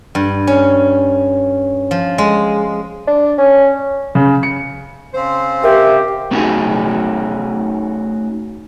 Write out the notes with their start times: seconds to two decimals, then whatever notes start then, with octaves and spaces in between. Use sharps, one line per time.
0.15 G2
0.47 C#4
1.91 F3
2.18 G#3
3.08 D4
3.38 C#4
4.15 C#3
4.43 C#7
5.14 C#3 C4 C5
5.63 G4 A#4 E5
6.31 A3 B3 C#4 D#4 F#4 G#4